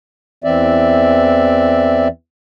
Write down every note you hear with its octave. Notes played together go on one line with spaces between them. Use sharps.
E2 E3 C4 D5 E5